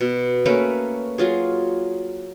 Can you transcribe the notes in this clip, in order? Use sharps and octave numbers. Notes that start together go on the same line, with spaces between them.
B2
A3 A#3 C#4 B4
F#3 F4 G#4